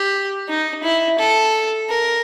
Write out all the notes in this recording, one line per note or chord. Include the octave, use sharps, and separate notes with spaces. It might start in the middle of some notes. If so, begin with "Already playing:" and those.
Already playing: G4
D#4
E4
A4
A#4